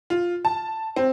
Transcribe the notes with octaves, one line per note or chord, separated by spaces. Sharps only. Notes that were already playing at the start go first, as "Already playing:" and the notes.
F4
A5
C4